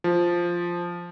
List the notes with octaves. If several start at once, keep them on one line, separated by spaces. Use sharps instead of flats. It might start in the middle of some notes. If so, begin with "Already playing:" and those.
F3